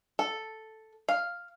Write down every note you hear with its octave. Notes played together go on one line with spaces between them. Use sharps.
A4
F5